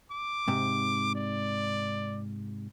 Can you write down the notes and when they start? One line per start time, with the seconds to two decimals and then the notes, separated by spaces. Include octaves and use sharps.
0.12 D6
0.48 G#2 C3
1.15 D5